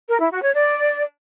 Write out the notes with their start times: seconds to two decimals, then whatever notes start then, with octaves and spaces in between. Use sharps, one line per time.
0.09 A#4
0.20 E4
0.32 F#4
0.43 C#5
0.54 D5